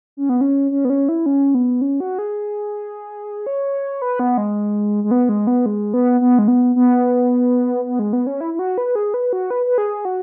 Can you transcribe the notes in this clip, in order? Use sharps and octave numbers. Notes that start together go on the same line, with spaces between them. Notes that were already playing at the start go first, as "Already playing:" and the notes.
C#4
B3
C#4
C#4
B3
C#4
E4
C#4
B3
C#4
F#4
G#4
C#5
B4
B3
G#3
G#3
B3
G#3
B3
G#3
B3
B3
G#3
B3
B3
B3
G#3
B3
C#4
E4
E4
F#4
B4
G#4
B4
F#4
B4
B4
G#4
F#4